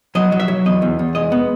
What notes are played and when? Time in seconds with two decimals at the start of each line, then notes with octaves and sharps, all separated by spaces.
0.15 F#3 D#5
0.32 F#3
0.40 E5
0.48 F#3
0.66 E2 D#5
0.82 E2
0.99 E2
1.15 G#3 D#5
1.32 B3